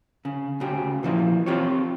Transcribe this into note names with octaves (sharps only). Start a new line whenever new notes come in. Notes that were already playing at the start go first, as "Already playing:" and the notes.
C#3
D2 C#3 G4
A#2 E3 F3 D#5
C4 F4 G4 C5 C#5